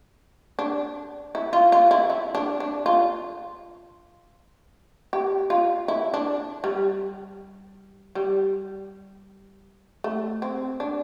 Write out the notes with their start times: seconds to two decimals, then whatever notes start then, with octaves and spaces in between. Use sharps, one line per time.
0.59 D4
1.35 E4
1.53 F4
1.72 F4
1.91 E4
2.10 E4
2.35 D4
2.60 D4
2.86 F4
5.13 G4
5.50 F4
5.88 E4
6.14 D4
6.64 G3
8.15 G3
10.04 A3
10.42 C4
10.80 D4